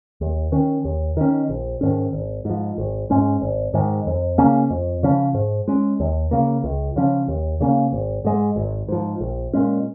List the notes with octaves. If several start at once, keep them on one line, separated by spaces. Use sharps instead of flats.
D#2
D#3 C#4
D#2
D#3 C#4
A#1
G#2 D#3 C#4
G#1
G#2 F3
G#1
G#2 G#3 C#4
G#1
G#2 D#3 G#3
F2
C#3 A#3 C#4
F2
C#3 F3 C#4
G#2
G#3 C#4
D#2
C#3 A#3
C#2
C#3 F3 C#4
D#2
C#3 A#3 C#4
G#1
G#2 G#3
G#1
G#2 F3
A#1
A#2 G#3 C#4